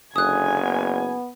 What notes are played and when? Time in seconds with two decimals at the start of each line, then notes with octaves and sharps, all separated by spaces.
0.16 F#1 D3 G#5 D#6 F#6
0.63 B3